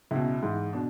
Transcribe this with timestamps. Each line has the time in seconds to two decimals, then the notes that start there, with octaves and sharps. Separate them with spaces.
0.11 C#2 B2 E4
0.43 G#2 E3
0.73 B2 D4